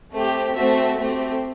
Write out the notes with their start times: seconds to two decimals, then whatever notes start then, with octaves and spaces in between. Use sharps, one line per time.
0.12 A3 C4 G4
0.55 A3 C4 F#4 A4 E5
0.98 A3 C4 G4